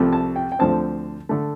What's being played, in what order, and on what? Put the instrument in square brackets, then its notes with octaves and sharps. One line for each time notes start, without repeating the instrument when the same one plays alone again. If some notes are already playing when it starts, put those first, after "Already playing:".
Already playing: [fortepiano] C2 C3 F3 A3
A5
G5
G5
D2 D3 F3 C4 A5
D3 A3